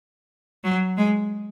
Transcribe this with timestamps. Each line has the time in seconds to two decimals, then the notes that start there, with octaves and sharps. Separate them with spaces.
0.64 F#3
0.97 G#3